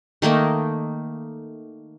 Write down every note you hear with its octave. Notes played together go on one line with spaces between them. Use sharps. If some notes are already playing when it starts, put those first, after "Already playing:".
D#3 A3 A#3 D#4